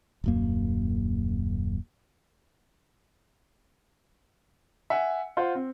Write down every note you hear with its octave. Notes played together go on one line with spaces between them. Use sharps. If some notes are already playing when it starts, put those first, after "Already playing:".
D#1 F#2 A#3
E5 F#5 G#5
F4 C5 F#5
C4